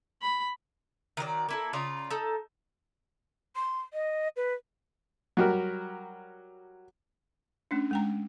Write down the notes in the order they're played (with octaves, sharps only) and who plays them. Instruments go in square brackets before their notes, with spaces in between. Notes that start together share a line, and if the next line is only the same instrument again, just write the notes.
[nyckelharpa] B5
[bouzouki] D#3 F#3 A#4 D5
A#3 E4 A4
C#3 F4 D5 A#5
D#4 A4
[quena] C6
D#5
B4
[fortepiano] F#3 G3 F#4 G4 A#4
[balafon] A3 C#4 D4
G#3 G5 A#5